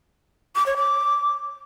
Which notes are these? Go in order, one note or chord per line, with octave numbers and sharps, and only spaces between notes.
D6
C#5
D6